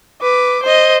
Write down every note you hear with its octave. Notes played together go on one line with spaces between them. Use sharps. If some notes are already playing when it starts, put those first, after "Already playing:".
B4 D6
C5 D#5